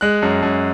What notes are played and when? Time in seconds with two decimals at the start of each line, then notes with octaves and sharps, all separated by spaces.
0.01 G#3 F#6
0.22 F#2
0.43 F#2